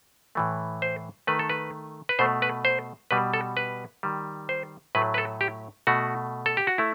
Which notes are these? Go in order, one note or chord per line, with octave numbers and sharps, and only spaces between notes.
A2 E3 A3
C5
D#3 A3 B4
A4
B4
B4
B2 A3 C5
B4
C5
B2 G3 B4
A4
B4
D#3 G3
C5
A2 F#3 A3 B4
B4
A4
G4
B2 A3 F#4
A4
G4
F#4
A3 E4